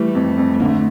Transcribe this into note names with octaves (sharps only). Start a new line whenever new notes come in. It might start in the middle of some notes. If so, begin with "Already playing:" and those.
Already playing: E3 G3 A3
F2
F2
D3 A#3
A3